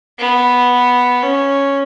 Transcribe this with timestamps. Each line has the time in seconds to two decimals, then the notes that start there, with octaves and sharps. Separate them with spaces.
0.19 B3
1.23 C#4